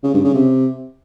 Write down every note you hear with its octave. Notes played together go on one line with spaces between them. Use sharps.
C#3
G2
C#3
C3